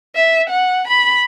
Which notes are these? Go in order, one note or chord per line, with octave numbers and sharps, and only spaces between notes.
E5
F#5
B5